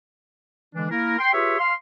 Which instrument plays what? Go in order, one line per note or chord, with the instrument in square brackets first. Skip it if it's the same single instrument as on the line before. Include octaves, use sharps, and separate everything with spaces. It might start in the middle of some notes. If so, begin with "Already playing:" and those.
[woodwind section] D3 E3 G#3 D4
A#3 E4 A#4
G5 C6
F4 G4 G#4 B4 C#5 E5
F5 C6